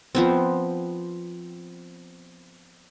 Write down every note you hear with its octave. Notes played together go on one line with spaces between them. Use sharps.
F3 B3 C4